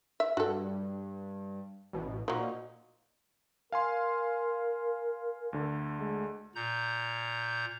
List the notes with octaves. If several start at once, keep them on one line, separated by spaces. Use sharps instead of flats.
E5
G2 F#4 A4
A1 B2
A#2 F3 F#3 D#4
A#4 F5 G#5 C6
D2 D3
G#3
A#2 A#5 G6